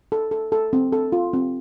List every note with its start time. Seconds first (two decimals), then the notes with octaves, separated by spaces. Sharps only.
0.12 A4
0.31 A4
0.52 A4
0.73 C4
0.92 A4
1.12 F4
1.33 C4